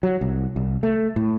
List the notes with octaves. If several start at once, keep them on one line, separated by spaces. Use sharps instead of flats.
F#3
C2
C2
A3
A2